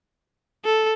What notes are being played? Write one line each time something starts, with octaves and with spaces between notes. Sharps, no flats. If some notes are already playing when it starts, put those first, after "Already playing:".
A4